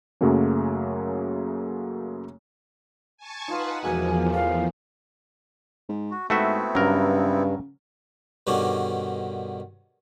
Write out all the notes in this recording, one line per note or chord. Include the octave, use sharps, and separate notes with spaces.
F#2 C#3 F#3 A3 A#3 C#4
G#5 A5 C#6
D#4 F4 B4 D#5 F#5
E2 B2 F3 G#3 A#3 G#5
A2 F5
G#2
F#4
G#2 A3 B3 C4 E4 F#4 E5
G2 C#3 F#3 A#4
G2 B2 D3 D#3 C#4 D4